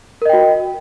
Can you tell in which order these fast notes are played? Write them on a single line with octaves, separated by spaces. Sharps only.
A#4 D#5 G5 F#4